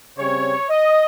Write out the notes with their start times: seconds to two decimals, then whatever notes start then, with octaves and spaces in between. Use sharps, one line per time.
0.18 C#3 G3 C4 C#5
0.70 D#5